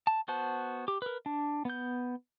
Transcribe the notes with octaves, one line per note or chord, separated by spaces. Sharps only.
A5
B3 F#4 C5 A5
G4
A#4 B4
D4
B3 G6